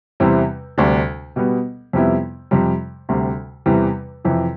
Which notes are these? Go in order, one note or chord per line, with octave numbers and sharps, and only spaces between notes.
E2 C3 G3 C4 E4
D2 C3 G3 D4
B2 G3 B3
F2 C3 G3 B3 E4
F2 C3 G3
D2 C3 G3
E2 C3 E3 G3
F2 C3 E3